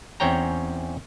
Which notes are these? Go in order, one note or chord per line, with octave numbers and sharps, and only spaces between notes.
E2 C4 C#4 C#5 G5 A#5